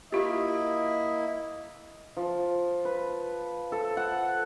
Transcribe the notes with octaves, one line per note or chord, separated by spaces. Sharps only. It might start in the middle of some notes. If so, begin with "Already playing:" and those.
A#3 E4 F4 G4 D#5
F3
B4
A4
F#5